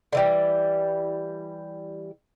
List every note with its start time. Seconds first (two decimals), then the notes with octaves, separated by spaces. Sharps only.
0.12 D3 E3 G3